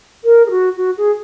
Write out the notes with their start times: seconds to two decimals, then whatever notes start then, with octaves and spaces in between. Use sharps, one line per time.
0.24 A#4
0.46 G#4
0.51 F#4
0.77 F#4
0.98 G#4